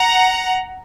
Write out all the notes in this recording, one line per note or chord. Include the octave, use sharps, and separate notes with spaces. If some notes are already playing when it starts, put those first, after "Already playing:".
Already playing: F#5 A#5